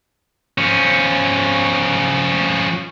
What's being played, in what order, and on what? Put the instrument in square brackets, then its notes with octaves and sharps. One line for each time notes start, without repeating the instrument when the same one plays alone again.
[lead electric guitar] F3 C#4